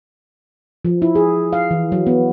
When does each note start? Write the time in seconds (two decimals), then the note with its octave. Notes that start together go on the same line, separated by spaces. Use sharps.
0.85 F3
1.02 E4
1.15 G#4
1.53 F5
1.71 E3
1.92 F#3
2.07 B3